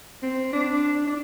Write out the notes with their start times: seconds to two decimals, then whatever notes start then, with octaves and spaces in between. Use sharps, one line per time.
0.23 C4
0.53 D4
1.07 D4